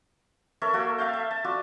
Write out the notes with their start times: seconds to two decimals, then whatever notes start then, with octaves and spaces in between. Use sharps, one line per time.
0.62 A4 A#4 C#5 E5
0.73 A#3 F#4 A4
0.98 A4 E5 F5 G5
1.13 E5
1.31 A5
1.44 F4 F#4 D5